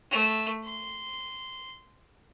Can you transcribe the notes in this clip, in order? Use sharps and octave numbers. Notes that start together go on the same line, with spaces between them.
A3
C6